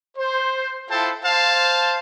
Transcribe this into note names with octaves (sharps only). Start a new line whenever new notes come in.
C5
E4 F4 A4 C5 G5 A5
C5 F5 A5